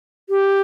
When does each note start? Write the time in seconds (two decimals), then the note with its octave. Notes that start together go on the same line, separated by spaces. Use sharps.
0.30 G4